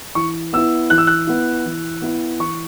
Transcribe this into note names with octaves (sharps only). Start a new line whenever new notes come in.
E3 C#6
B3 E4 E6
E3 F#6
E6
F#6
B3 E4
E3
B3 E4
E3 C#6